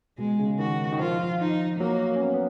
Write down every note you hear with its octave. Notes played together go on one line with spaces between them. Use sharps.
B2 G#3
C#3
D#3 F#4
D#3
F3 F4
D#4
F#3 A#3
C#4
B3
B3